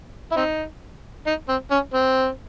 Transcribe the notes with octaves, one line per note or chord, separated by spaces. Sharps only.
E4
C4 D#4
D#4
C4
C#4
C4